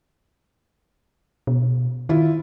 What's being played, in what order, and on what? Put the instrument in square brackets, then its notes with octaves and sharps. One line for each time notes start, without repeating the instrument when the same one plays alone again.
[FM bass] B2
[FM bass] D#3 [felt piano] E4 F4